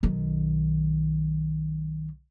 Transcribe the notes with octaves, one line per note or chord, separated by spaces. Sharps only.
B1 D#3